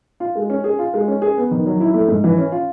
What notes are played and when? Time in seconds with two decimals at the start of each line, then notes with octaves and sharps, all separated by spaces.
0.20 F4
0.35 G#3
0.50 C#4
0.64 G#4
0.79 F4
0.94 G#3
1.08 C#4
1.22 G#4
1.37 B3
1.51 D#3
1.66 F#3
1.81 E4
1.94 A3
2.08 G#2
2.24 E3
2.38 C#4
2.52 F4